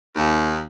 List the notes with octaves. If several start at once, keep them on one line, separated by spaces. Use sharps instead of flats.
D#2